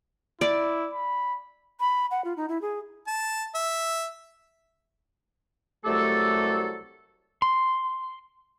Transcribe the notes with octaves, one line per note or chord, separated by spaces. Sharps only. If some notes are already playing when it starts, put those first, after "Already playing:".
E4 D5
B5
B5
F#5
F4
D#4
E4
G#4
A5
E5
C2 F#3 A3 G4 A4
C6